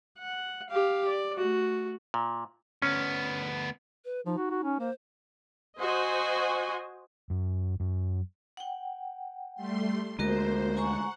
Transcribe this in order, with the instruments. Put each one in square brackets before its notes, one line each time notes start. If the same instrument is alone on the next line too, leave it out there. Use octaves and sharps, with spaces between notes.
[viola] F#5
G4 F5
D5
A3 F#4
[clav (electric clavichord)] A#2
[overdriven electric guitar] D2 B3 [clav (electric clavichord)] C#4
[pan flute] B4
[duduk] F3 [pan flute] D#4
[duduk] F#4
F#4
C#4
[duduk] A#3 [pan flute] C5
[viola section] F#4 C5 D#5 G#5
[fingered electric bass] F#2
F#2
[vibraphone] F#5 G5
[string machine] G3 A3 C6
[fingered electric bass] D2 G#3 [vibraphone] A#3 F#4 A#4 [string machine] C5
[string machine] F#5 [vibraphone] G#5 A#5 C#6